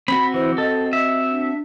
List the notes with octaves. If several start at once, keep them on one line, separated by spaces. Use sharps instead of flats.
C4 F#4 B5
E3 C5
A4 D#5
E5
D4